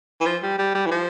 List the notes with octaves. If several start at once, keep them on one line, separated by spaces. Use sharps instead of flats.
E3
F3
G3
G3
G3
E3
F3